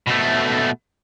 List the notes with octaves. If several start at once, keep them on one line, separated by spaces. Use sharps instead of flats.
B2 A3